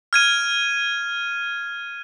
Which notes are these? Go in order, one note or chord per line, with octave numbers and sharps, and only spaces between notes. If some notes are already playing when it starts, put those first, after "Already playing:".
F6 G#6 D#7